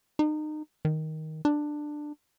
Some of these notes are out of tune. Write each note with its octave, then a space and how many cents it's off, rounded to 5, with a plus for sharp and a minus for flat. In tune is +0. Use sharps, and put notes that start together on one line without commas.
D#4 -30
D#3 +10
D4 +15